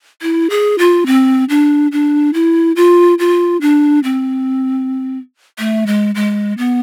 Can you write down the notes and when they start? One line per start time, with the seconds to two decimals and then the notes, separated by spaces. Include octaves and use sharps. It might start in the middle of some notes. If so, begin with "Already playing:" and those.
0.22 E4
0.50 G#4
0.79 F4
1.06 C4
1.49 D4
1.92 D4
2.34 E4
2.76 F4
3.19 F4
3.61 D4
4.04 C4
5.59 A3
5.87 G#3
6.15 G#3
6.58 B3